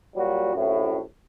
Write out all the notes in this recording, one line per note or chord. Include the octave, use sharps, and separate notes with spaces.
A#2 F#3 G3 F#4
A#1 F#2 A2